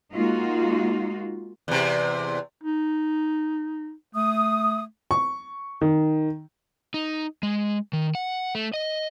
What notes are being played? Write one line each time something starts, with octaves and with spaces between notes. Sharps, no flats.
G#3 A#3 D#4 F4 F#4
E2 C3
D#4
A3 D#6
C#6
D#3
D#4
G#3
D#3
F#5
A3
D#5